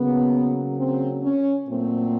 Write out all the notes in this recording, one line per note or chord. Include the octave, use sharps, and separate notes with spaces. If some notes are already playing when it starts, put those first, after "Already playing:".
Already playing: C#3 F#3 A#3 B3
C4
C#4
A#2 F#3 A3 C4